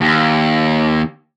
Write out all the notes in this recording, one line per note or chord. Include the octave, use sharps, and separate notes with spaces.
D#2